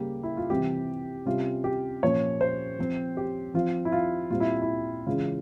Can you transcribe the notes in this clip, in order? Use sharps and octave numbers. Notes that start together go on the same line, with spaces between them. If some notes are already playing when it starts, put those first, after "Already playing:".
Already playing: C#3 G3 A#3 G4
E4
F4
C3 E3 G3 C4 G4
C3 G3 C#4 F4
G4
A#2 F3 A#3 C#4 C#5
C5
F3 C4
G4
F3 C4 F4
E4
F4
A#2 G3 C4 F4
E4
E4
C#3 E3 G#3 C#4 F4